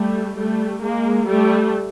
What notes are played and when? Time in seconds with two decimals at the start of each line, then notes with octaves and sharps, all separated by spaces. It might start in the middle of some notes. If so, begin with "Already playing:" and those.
Already playing: G3 A3
0.36 G3 A3
0.82 G#3 A#3
1.27 G3 A3